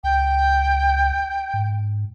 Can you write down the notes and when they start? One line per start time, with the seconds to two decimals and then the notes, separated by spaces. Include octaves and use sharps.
0.04 C#2 G5
1.54 G#2